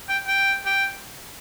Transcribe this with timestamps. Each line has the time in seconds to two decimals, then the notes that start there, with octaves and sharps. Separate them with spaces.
0.09 G5
0.27 G5
0.65 G5